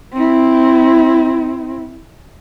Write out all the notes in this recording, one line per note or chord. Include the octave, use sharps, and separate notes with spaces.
C4 E4